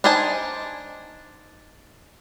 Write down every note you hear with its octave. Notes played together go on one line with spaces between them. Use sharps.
D4 D#4 C5 G#5 A5